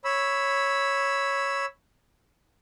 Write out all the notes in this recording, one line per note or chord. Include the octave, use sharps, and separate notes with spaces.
C#5 B5 E6